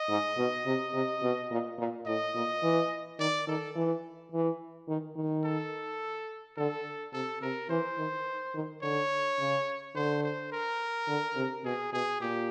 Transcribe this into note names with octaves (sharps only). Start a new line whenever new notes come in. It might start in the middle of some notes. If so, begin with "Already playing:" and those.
Already playing: D#5
G#2
B2
C3
C3
B2
A#2
A#2
A2 D#5
A#2
E3
D#3 D5
D#3 A4
E3
E3
D#3
D#3
A4
D3 A4
C3 A4
C3 A#4
E3 C5
D#3
D#3
D3 C#5
C#3
D3 C5
C5
A#4
D3
C3
B2 G#4
B2 G#4
A#2 G4